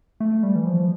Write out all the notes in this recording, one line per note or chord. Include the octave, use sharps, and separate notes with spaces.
A3
G3
E3
F3